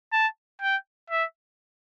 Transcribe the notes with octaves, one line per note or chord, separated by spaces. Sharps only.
A5
G5
E5